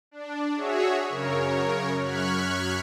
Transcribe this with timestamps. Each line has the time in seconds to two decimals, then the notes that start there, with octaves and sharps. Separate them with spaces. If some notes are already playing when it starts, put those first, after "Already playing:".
0.11 D4
0.56 F#4 G#4 C#5 E5
1.09 F#2 C#3 A#4 C#5
2.00 F#2 C#6 F6 F#6 G#6 B6